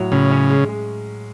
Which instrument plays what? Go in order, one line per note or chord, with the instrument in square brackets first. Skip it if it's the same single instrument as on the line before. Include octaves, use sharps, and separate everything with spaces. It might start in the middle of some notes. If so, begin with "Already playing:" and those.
Already playing: [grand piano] A2 F#3
[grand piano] A2 [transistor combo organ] C#3
[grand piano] C#4
G#3
G#3